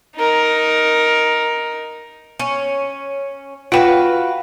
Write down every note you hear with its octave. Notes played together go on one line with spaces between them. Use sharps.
D#4 A#4
C#4
F4 F#4 B4 F5 G5